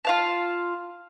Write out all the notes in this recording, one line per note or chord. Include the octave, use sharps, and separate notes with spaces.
F4 F5 A5